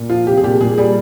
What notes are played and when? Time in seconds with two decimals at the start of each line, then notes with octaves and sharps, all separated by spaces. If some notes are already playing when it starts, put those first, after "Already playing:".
Already playing: A#2
0.09 F3 F4
0.27 C3 G4
0.37 G#4
0.43 A#2 G4
0.61 A#2 G#4
0.78 G3 G#4